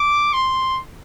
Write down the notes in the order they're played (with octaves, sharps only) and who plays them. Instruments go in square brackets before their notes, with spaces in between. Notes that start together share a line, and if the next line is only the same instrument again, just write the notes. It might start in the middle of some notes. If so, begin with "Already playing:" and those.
Already playing: [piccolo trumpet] D6
C6